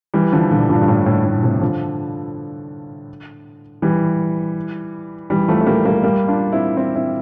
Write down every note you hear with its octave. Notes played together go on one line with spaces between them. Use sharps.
E3 G3
D3 F3
A#2 D3
G2 A#2
G2
A2
A2
A2
A2 C3
D3 F3
E3 G3
E3 G3
F3 A3
A3
G3 A#3
G3 A#3
G3 A#3
D4 F4
C4 E4
C4 E4
C4 E4